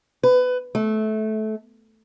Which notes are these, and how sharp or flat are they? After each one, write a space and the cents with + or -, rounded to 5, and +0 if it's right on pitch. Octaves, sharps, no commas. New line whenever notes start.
B4 +20
A3 -20